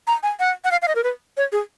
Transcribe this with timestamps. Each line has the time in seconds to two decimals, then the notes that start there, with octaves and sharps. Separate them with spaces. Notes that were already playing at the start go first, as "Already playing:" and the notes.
0.07 A#5
0.23 G#5
0.40 F#5
0.64 F#5
0.71 F5
0.82 F5
0.88 D#5
0.96 A#4
1.04 B4
1.37 C#5
1.52 G#4